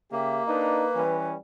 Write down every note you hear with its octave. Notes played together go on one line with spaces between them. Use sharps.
C#3 A#3 G4 E5
D4 D#4 B4
E3 G3 C#4